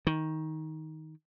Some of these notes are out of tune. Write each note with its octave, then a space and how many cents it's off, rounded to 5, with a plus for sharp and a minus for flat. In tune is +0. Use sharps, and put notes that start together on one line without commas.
D#3 +15